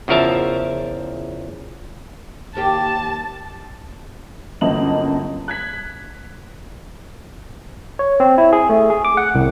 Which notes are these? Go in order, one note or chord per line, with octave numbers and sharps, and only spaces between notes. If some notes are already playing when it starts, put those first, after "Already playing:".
E2 C#3 F3 A#4 E5 A5
D#2 A#3 G4 A5
G1 F#2 A#3 D#5 A5 F#7
F#6 G#6 B6
C#5
C4
E4
G#4
A3
G#4
D6
F#5
C2